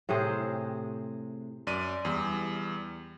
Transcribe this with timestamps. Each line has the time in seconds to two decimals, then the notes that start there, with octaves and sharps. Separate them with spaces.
0.09 A2 C3 G#4 C5
1.67 F#2 D5 D#7
2.05 E2 G3